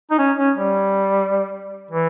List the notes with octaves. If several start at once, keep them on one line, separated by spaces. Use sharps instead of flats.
D#4
C#4
C#4
G3
E3